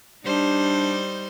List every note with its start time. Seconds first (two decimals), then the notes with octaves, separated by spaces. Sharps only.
0.24 G3 D4 D#4 C5